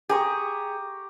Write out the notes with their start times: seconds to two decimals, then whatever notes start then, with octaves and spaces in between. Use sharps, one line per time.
0.09 G4 G#4 A#5 C#6